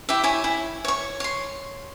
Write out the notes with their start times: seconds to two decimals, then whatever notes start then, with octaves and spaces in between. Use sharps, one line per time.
0.09 E4 G4 E5
0.24 E4 C#5 G#5
0.44 E4
0.85 C#5 C#6
1.20 C#5 C6